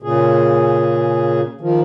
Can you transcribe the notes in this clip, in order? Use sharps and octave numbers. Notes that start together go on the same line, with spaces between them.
A#2 C#3 G#4
D#3 F3